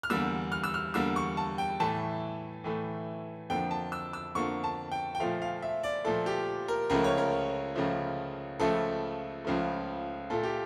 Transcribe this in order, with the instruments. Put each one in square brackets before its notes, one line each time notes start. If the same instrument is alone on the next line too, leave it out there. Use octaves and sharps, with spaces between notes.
[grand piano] F6
E2 D3 G3 A#3 E6
F6
E6
F6
E2 D3 G3 A#3 E6
C#6
A5
G5
A2 E3 A3 A5
A2 E3 A3
F2 D3 F3 A#3 G5
A5
E6
E6
F2 D3 F3 A#3 C#6
A5
G5
G5
A#2 F3 A3 F5
F5
E5
D5
A#2 F3 A3 A4
G4
A#4
C#2 C#3 F3 A3 A#4
C#5
A#4
C#2 C#3 F3 A3
C#2 C#3 F3 A3 A4
C#2 C#3 F3 A3
A#2 A3 A4
G4